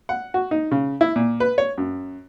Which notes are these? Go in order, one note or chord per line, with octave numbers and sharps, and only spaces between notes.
F#5
F#4
D#4
C#3
E4
A#2
B4
C#5
F#2